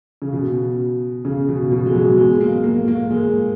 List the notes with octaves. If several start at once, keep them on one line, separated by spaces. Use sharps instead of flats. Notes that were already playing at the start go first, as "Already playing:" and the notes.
C#3
B2
C#3
B2
B2
G#3
F#3
G#3
A#3
A#3
A#3
G#3